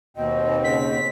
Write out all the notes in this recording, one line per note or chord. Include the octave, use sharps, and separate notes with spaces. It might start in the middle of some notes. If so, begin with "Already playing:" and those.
D#2 B2 C4 D#5
C#3 B6